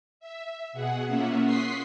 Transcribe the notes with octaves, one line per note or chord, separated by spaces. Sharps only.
E5
B2 G#4 F#5
A#3 C#4 F4 E5 F#5
C6 C#6 D#6 F#6 B6 C7